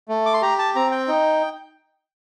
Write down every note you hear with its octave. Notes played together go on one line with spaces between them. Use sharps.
A3
D6
C6
G4 A#5
A5
C4 A#5
G5
D#4